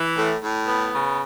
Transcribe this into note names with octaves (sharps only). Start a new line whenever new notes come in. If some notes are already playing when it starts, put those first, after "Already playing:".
Already playing: E3
A2
A2
B3
C#3